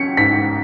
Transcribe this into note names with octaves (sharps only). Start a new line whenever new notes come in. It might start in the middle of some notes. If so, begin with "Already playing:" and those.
Already playing: F#3 C#4 B6 C#7
G#2 B6